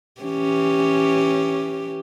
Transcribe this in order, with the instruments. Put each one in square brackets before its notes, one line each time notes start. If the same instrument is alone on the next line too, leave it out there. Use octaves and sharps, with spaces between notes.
[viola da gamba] E3 C#4 G4